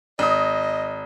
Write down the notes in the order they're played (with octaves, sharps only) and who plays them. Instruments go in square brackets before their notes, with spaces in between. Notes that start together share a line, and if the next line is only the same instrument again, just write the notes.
[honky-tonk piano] G#1 D#6 [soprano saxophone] D#5